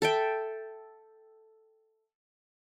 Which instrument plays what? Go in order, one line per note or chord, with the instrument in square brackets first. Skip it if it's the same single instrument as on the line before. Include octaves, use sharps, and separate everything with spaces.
[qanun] A4 E5 G5